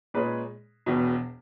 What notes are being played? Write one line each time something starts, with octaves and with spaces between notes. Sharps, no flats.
A#2 G#3 C#4 G#4 B4
E1 E2 B2